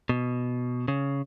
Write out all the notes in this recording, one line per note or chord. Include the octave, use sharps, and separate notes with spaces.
B2
C#3